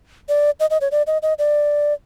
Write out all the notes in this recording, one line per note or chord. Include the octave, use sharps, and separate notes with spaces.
D5
D#5
D#5
C#5
D5
D#5
D#5
D5